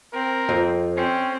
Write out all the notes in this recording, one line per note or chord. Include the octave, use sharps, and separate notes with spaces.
C4 A#4
F2
C4 C#4